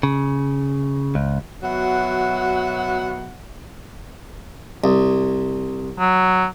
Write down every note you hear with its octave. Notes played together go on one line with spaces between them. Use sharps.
C#3
C#2
B2 F#3 E5 F#5
C2
F#3